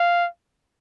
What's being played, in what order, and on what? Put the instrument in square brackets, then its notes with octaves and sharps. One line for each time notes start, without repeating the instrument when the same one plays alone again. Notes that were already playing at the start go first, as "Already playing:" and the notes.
Already playing: [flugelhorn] F5